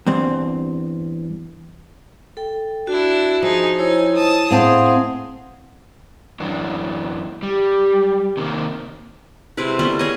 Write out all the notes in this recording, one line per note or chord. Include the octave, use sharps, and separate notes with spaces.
E2 G2 C4
A4 G5
D4 E4 F#4
F3 D#4 G#4
D#4 E4 C5 C#5 G#5
A5 D#6
A2 C4 G#4 F5 F#5 A5 D#6
F#2 E3 D4
G3 G4
C3 D#3 A#3
C3 G#3 E4 B4
G3 A3 B3 C#4
G#4 C#5 D#5